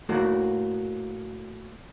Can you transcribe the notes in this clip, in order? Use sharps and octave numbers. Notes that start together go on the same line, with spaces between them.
A2 A3 A#3 F#4